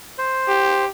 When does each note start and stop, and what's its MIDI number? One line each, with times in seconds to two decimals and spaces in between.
0.18 0.85 72
0.48 0.89 67